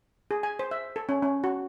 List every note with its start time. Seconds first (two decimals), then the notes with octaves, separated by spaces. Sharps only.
0.31 G#4
0.43 G#5
0.59 C5
0.71 E5
0.96 A4
1.09 C#4
1.22 C#4
1.44 F#4